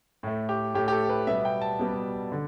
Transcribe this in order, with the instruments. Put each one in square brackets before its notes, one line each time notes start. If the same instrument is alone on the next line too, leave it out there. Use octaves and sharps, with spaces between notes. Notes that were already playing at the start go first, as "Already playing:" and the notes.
[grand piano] A2 A3
G4
A2 A3 G4
G4
A4
B4
B2 G3 B3 E5
G5
A5
B2 G3 B3
D3